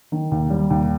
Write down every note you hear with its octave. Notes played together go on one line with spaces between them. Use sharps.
D#3
D#2
G3
D#2